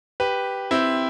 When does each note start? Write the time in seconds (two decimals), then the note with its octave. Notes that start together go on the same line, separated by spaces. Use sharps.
0.20 G4 B4
0.71 C4 E4